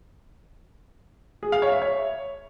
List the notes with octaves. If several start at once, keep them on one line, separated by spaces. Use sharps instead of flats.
G#4
F5
C#5
E5
C#5